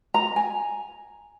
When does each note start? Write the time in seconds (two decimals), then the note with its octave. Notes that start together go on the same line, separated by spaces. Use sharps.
0.14 A#5
0.36 G#5